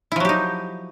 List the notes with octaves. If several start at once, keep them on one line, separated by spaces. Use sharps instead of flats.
F3 F#3 D#4 E4 G4